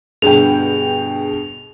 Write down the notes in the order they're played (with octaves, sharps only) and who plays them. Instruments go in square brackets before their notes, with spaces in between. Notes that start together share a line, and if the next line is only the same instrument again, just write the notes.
[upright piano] G2 B2 D3 [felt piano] G#4 G5 [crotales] F7